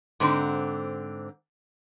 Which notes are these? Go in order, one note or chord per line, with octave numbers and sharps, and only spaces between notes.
G#2 D3 C4